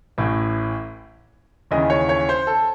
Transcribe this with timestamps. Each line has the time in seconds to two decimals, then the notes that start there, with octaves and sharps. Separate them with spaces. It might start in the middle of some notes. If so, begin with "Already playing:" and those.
0.18 A1 A2 E3
1.71 D#2 C#3 E3 D#5
1.90 C#5
2.09 C#5
2.29 C5
2.47 A4